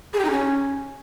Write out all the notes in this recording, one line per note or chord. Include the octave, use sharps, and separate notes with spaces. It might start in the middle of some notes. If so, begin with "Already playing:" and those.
G#4
G4
D#4
C#4